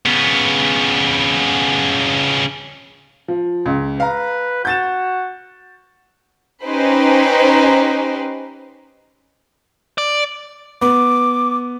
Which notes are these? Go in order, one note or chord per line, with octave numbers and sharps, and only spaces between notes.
C#3 B3
F3
C#2
B4 F5 A#5
F#4 G6 A6 E7
C#4 D#4 G4 B4 C5
D5
B3 D6